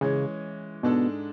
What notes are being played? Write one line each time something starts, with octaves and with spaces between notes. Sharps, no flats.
C#3 E3 G#3 C#4
G#2 B2 G#3 D4 A4